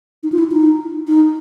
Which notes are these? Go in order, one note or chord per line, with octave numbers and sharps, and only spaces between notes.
D#4
F4
E4
D#4
D#4